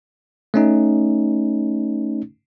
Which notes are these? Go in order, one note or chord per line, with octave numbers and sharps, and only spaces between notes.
A3 C#4 D#4